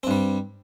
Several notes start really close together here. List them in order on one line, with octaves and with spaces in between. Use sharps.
C4 G2 G3